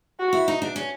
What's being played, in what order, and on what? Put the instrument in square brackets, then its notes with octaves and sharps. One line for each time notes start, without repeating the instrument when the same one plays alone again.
[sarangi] F#4
[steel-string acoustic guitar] E4
D#4
D4
C#4